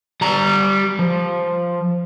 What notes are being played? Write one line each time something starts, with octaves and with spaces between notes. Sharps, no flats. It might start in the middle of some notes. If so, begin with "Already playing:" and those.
G3 A#5
F3